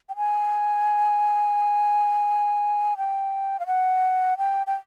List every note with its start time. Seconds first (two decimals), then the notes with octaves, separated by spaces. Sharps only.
0.09 G5
0.16 G#5
2.97 G5
3.60 F5
3.67 F#5
4.38 G5
4.67 G5